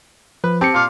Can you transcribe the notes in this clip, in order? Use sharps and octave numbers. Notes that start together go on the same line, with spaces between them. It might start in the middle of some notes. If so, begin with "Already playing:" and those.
F3 B4
C4 G4 A5 C#7
A#2 F5 D6